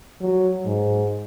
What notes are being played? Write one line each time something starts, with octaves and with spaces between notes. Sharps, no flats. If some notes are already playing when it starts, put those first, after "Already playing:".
F#3
G#2